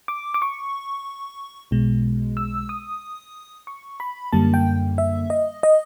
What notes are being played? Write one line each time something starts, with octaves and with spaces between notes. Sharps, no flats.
D6
D6
C#6
B1 B2 G#3
E6
D#6
C#6
B5
F#2 D3 G3 A#3 A5
G5
E5
D#5
D#5